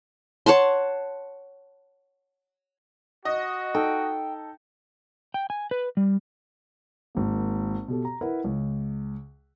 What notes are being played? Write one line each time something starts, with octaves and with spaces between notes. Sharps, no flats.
C#5 F#5 A5 C6
F#4 D#5
D#4 A4 G5
G5
G#5
B4
G3
G#1 A#3
B2 G4 A4
A#5
E4 A#4 B4 F#5
C#2